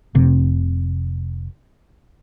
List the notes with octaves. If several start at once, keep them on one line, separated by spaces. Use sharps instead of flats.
F1 C3